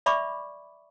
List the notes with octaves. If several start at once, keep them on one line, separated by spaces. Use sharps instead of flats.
D5 E5 B5 C#6 D6